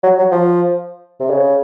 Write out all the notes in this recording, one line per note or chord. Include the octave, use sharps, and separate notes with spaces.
F#3
F#3
F3
C3
C#3